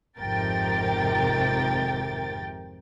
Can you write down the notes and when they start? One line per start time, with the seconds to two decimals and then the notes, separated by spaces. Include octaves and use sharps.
0.19 G#1 F2 C3 A#4 G5 A6